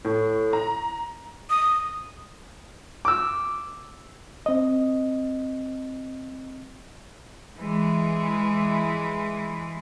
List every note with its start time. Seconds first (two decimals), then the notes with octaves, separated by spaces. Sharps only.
0.05 A2
0.53 A#5
1.50 D#6
3.05 D6 E6
4.46 C4 D#5
7.57 E3 G#3